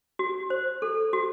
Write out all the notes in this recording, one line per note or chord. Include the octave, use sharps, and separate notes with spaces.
F#4
C5
A4
F#4